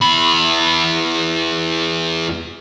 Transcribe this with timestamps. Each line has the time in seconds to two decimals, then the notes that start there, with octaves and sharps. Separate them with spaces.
0.02 E2 B5